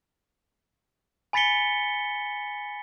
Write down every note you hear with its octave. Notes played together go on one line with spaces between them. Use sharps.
G#5 B5 A6 B6 C#7 G7